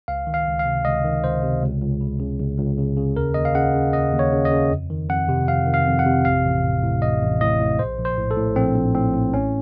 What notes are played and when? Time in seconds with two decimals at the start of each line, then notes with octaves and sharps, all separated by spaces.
0.08 C#2 F5
0.27 D#3
0.34 F5
0.47 C#2
0.59 F5
0.66 C3
0.85 C#2 D#5
1.04 D#3
1.24 C#2 C5
1.43 C3
1.62 C#2
1.81 C#2
2.01 C#3
2.20 C#3
2.39 C#2
2.58 C#2
2.78 C#3
2.97 C#3
3.16 D#2 A#4
3.34 D#2 D#5
3.45 F5
3.55 C#3 F#5
3.74 C#3
3.93 D#2 D#5
4.13 D#2
4.19 C#5
4.32 C#3
4.45 D#5
4.51 C#3
4.71 F2
4.90 D#3
5.09 F2 F#5
5.29 C3
5.48 F2 F5
5.67 D#3
5.74 F5
5.86 F2
5.99 F#5
6.06 C3
6.25 A1 F5
6.45 A1
6.64 A2
6.83 A2
7.02 A1 D#5
7.21 A1
7.41 A2 D#5
7.60 A2
7.79 A#1 C5
7.99 A#1
8.05 C5
8.18 A2
8.31 A4
8.37 A2
8.56 A#1 C4
8.75 A#1
8.95 A2 C4
9.14 A2
9.34 A1 C#4